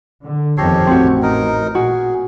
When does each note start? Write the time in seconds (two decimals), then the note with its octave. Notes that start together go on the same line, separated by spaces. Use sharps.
0.24 D3
0.58 G1 F2 D#3 G4 A4 C#5 A#6 C7
0.87 A1 C4 F#4
1.23 D#4 A#4
1.75 A#2 F#4 G#4